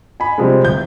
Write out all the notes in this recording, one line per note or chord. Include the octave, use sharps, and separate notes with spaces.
G#5 B5
C3 F3 G3 G#3
D1 G6